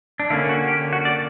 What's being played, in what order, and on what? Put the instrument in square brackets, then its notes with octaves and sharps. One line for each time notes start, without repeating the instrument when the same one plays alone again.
[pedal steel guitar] D4
D3 A#3 C#4 E4
F#4
G4
F#4
D5